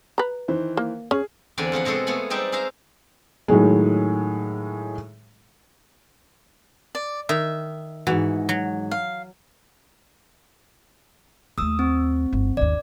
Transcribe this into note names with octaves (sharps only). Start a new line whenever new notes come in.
B4 A#5
D#3 E3 C5
A#3
C#4 G#4
E2 D3 C4 D5 G#5 B5
F2 F4 G#4 F#5
B2 G#3 C4 G#4 A4 C#5
G#3 A3 B3 G#5 B5
G3 G#3 C4 D#4 D5 E5
G#4 C5 E5 F5 A#5
A2 D#3 F#3 G#3
D5
D#3 E5
G#2 E3 F#4
F#3
F5
D#2 A3 D#6 E6
C4
G1
G1 D#2 D5